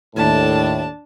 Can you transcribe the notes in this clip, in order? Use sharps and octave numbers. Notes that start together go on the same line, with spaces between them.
D#2 A2 D4 A5